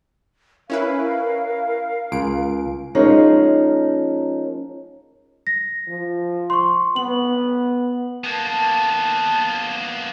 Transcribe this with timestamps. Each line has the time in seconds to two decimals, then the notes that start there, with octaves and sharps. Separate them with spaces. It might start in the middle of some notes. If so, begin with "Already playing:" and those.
0.70 C#4 E4 A#4 B4 F5
2.12 C#2 D7
2.95 F3 G#3 A#3 C#4 D#4
5.47 A#6
5.88 F3
6.50 C6 C#6
6.96 B3 F#7
8.24 A#3 B3 A5